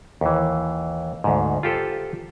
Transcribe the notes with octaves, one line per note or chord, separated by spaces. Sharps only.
D#2 E3
D2 G#2
F4 G4 A4 C5